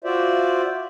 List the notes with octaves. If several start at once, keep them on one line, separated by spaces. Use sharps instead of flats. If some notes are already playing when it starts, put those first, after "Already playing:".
F4 F#4 C5 D5 E5